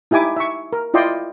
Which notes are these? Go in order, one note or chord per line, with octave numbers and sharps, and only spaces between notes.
D#4 E4 G4 G#5 D6
E5 C#6
A#4
E4 F4 D5 D#5 G5 C6